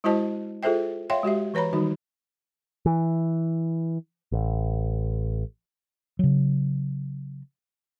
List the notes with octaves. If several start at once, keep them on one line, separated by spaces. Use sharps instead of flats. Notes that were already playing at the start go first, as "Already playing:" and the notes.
G#3 E4 F#4 C5 D#5 A5
F4 G#4 A4 C5 E5 G5
C#5 E5 F5 G5 C6
G#3 F#4 G4 E5
E3 B4 C#5 A#5 B5
D#3 G3 D#4 F#4
E3
A1
C#3 F#3